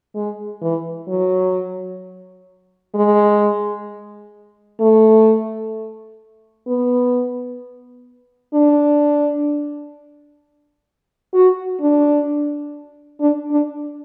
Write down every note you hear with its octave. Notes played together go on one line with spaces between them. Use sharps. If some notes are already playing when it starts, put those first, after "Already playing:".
G#3
E3
F#3
G#3
A3
B3
D4
F#4
D4
D4
D4